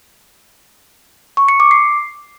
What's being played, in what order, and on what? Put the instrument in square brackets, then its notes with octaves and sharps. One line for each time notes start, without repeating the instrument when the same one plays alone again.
[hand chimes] C#6
C#7
D6
C7